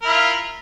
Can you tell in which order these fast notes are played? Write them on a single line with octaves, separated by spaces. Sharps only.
A#4 E4 F4